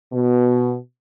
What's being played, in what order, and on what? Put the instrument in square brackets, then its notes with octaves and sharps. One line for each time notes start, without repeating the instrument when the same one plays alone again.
[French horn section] B2